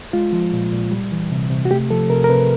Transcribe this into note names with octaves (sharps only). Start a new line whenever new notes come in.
G#3 F4
F3
A#2
A#2
G3
E3
C3
C3
F#4
A3 G4
F3 A4
C3 A#4
A#4
C3 B4